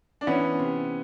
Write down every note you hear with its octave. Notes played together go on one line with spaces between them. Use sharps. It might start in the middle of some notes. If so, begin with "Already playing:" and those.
D4
E3 B3 C#4
C3